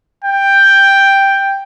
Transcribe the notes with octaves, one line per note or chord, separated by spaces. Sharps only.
G5